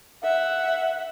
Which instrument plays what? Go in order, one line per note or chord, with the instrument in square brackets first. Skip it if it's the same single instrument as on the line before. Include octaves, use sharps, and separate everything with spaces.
[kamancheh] E5 F#5